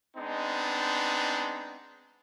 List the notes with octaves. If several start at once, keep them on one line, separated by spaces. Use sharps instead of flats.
G#3 B3 C4 D4 D#4